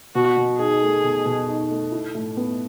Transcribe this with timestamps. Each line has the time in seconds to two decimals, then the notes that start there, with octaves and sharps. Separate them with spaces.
0.15 B2 F#4
0.37 B2
0.59 D#4 G#4
0.81 A3
1.04 B2
1.26 B2
1.48 D#4
1.69 A3
1.92 E4
2.15 A2
2.37 B3